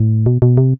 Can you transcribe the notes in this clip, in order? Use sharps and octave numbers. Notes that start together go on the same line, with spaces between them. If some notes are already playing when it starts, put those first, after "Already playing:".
Already playing: A2
B2
B2
C3